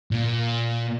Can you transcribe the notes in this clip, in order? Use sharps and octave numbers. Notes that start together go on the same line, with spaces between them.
A#2